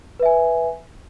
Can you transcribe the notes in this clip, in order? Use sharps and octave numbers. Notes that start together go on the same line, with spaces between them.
B4 E5 G#5